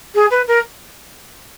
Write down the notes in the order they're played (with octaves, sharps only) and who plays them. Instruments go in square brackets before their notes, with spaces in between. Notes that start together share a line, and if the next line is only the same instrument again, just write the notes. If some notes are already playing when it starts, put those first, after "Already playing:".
[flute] G#4
B4
A#4